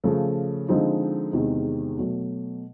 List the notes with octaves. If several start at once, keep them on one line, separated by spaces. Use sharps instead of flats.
C#3 F3 A3
D3 F3 G#3 C4 D#4
E2 C3 D#3 G#3
B2 F#3 A3